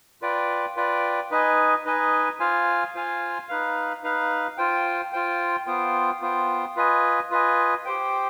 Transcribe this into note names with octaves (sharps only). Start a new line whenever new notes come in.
F4 B4 D5 G5
F4 B4 D5 G5
D#4 B4 D#5 G#5
D#4 B4 D#5 G#5
F4 C5 F5 G#5
F4 C5 F5 G#5
D#4 B4 F5
D#4 B4 F5
F4 C5 G5
F4 C5 G5
B3 F4 C5 G5
B3 F4 C5 G5
F4 B4 D#5 G#5
F4 B4 D#5 G#5
G4 C5 G5